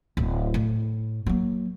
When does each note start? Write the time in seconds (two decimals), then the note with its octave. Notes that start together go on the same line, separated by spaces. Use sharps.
0.17 D1
0.54 A2
1.26 F#3 A#3